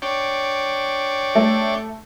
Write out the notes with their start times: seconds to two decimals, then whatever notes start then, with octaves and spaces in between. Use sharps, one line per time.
0.02 D4 C#5 G5
1.35 A3